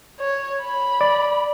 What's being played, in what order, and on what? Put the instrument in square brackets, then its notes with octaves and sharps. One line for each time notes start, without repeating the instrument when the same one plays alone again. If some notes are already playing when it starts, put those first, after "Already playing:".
[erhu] C#5
B5
[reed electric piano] D5